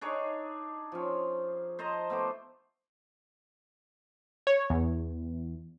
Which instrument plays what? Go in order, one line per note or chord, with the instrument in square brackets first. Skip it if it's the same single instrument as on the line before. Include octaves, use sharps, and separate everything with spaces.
[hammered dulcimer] D4 D#4 G#4 C#5
F3 C#4
C5 D#5 A5 A#5
A3 B3 C5 D6
[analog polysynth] C#5
E2